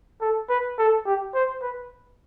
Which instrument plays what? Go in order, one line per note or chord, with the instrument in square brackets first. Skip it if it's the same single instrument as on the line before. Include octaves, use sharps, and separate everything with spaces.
[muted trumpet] A4
B4
A4
G4
C5
B4